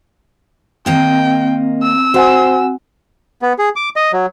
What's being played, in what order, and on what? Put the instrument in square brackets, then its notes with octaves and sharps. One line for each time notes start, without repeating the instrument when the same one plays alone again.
[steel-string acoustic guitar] D#3 A#3 D#5 [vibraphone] C4 [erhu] G5
[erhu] E6
[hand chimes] F#4 F#5 G#5 [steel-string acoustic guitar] C5
[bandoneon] B3
G#4
D6
D#5
F#3